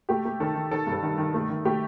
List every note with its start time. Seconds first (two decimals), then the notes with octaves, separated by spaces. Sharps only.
0.09 A3 G4
0.25 A3
0.40 D#3 A4
0.55 D#3
0.71 D#3 A4
0.87 G2 A4
1.03 D#3
1.18 D#3
1.34 A3
1.50 D#3
1.65 A3 G4